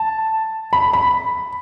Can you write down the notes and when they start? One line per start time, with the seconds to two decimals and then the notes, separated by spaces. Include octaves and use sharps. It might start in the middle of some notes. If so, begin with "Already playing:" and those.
Already playing: A5
0.73 B5
0.93 B5